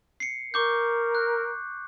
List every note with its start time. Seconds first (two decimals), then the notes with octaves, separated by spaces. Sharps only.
0.20 C7 C#7
0.54 A#4 C#6 D6 G6
1.15 F#6